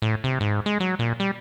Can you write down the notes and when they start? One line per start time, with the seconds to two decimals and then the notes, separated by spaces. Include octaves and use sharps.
0.02 A2
0.24 C3
0.41 G#2
0.66 G#3
0.80 F#3
0.99 A#2
1.20 G3